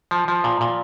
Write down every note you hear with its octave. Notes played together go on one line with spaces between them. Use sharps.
F3
F3
A#2
A#2